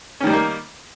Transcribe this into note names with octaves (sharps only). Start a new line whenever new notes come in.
D#3 G3 A#3 C#4 D#4